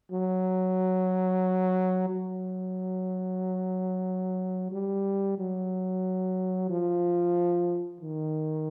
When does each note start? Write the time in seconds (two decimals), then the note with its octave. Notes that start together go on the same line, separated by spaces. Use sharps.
0.12 F#3
2.09 F#3
4.72 G3
5.39 F#3
6.70 F3
8.01 D#3